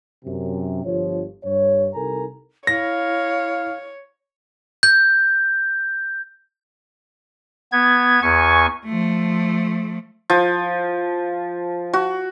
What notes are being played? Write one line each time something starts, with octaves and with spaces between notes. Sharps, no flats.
F#2 C3
G1 F3 C#5
G2 C#5
C2 D#4 A4 A#4 G#5 A#5
E4 C#5 F5 A#6
G6
B3 G#6
E2 G#5 C#6
F3 A3
F3
F#4